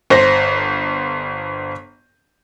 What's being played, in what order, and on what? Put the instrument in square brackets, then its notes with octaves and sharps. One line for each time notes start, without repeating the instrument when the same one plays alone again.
[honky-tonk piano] G1 C5 A#6